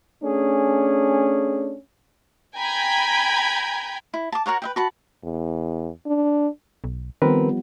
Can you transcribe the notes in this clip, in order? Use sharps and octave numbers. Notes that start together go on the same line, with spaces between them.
A3 C#4 D4 G#4
G5 G#5 A#5 B5 G6 G#6
E4
A5 D6
F#4 A#4 C#5 F#5
B4 E5 G5
F#4 A5 B5
E2
D4
B1
D#3 F3 G3 B3 C4 A#4 B4